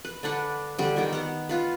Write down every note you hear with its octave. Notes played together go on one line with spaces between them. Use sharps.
B4
D3 D4 B4 F#5
D3 G3
D#3 G3 B3 G5
B3 F#5
B3 F4 B4